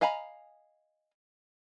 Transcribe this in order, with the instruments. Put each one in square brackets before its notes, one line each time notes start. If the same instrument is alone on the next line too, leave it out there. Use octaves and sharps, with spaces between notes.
[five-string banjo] D#5 F5 G#5 A#5 B5